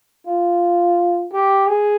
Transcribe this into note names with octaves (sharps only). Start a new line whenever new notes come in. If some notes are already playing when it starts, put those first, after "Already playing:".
F4
G4
G#4